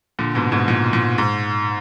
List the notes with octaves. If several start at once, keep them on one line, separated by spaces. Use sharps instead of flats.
A#2 D3
G#2 B2
G#2 B2
A#2
A#2
G#2